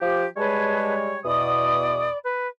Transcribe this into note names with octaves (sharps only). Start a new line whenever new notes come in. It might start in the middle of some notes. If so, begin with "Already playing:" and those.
F3 G4
G3 G#3 G#4 B4 C#5 A5
E2 B2 D5 B5 D#6
B4